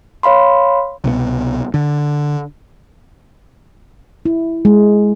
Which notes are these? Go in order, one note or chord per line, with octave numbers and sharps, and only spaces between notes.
C#5 F5 B5 C6
C2 B2 G#3 B3
D3
E4
G#3